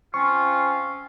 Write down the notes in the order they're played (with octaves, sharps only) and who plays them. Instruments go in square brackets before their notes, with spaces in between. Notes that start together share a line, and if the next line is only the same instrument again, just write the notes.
[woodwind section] C4 C#4 F4 [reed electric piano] C#6